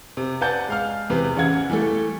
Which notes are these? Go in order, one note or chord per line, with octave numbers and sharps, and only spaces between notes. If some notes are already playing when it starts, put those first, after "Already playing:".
C3
B4 D5 F#5 A5 G6
G#3 F5 F6
E2 C3 B4
A1 C#3 F#5 G#6
E3 G3 A3 A4